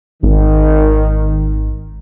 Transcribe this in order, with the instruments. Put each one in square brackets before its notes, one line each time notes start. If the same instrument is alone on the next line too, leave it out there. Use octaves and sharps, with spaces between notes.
[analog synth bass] G#1 [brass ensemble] D#3